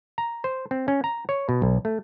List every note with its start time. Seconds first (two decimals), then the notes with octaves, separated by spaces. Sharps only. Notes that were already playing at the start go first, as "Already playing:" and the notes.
0.18 A#5
0.44 C5
0.71 C4
0.88 C#4
1.04 A#5
1.29 C#5
1.49 B2
1.62 B1
1.85 A3